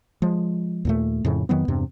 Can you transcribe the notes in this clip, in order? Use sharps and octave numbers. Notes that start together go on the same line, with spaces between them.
F3 G#3
D#2 A#2 A3
F2 A2 C#3
F2 D#3 F#3 B3
E2 G2 C3